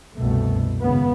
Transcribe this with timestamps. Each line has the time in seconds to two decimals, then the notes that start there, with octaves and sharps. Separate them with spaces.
0.15 C2 F#2 B2 A3
0.81 G#1 C#3 B3